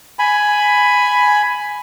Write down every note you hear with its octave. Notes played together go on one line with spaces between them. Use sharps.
G#5 B5